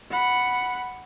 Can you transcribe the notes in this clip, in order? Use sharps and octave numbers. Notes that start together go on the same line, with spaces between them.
F#5 B5